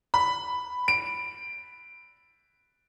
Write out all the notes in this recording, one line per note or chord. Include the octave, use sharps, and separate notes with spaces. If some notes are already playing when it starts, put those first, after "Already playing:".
B5
D7